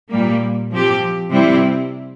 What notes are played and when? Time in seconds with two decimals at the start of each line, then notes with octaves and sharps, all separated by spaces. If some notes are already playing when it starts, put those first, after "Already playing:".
0.10 A#2 G3 A#3
0.71 F3 C4 G4
1.31 C3 G3 C4 E4